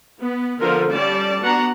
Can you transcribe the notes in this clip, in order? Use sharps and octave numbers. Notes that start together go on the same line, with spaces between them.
B3
D3 F3 B3 F4 A4 A#4
G3 C#4 D5 A5
B3 D4 F#4 F#5 A#5